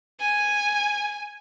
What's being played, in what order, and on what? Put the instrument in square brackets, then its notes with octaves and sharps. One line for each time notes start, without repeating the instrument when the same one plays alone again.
[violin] G#5